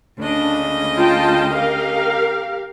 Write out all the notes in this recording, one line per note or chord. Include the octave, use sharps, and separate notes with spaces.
D2 C#3 D4 D#5
F4 G5 A5
G4 A#4 F5